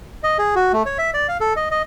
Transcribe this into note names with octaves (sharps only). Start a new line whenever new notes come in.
D#5
G#4
F#4
A3
C#5
E5
D5
F5
A4
D#5
D#5